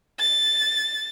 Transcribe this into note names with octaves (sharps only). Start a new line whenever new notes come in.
A6